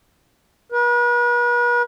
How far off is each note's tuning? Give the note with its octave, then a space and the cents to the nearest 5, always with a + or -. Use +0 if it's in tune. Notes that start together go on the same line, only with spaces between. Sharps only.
B4 -40